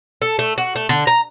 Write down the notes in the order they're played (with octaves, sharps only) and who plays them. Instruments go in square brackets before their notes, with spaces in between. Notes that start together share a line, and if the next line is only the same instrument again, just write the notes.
[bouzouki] A4
A3
F#4
A3
D3
A#5